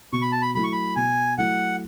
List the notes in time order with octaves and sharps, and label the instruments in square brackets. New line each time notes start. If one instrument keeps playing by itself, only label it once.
[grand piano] B2 [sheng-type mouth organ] C#6
[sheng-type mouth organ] B5
A5
B5
[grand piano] F#3 A3 E4 [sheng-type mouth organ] B5
[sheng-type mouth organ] C#6
B5
[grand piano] B2 [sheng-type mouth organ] G#5
[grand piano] F#3 A3 E4 [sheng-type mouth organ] F#5